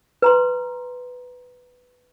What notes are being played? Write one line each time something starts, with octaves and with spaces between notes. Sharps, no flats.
B4 A#5 C6